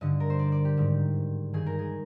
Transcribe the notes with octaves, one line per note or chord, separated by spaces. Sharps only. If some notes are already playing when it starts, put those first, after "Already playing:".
G2 D3 D#5
A#4
C5
D5
D5
G4
G#2 D#3
G2 D#3 G#4
A#4
G#4